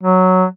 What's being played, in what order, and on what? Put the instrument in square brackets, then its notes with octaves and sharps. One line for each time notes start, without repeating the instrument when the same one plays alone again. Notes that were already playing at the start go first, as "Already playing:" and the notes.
[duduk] F#3